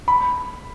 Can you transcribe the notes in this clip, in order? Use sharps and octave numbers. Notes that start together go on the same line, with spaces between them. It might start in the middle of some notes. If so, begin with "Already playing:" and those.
B5